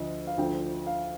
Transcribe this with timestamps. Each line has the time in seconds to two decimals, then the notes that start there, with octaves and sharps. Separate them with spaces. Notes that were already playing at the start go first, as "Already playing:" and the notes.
Already playing: D2 D3 F3 D#5
0.27 F5
0.38 D2 D3 F3 G5
0.87 F5